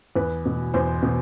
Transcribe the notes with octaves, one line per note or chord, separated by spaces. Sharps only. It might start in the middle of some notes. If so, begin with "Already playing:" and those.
E2 B4
B2
E2 C5
B2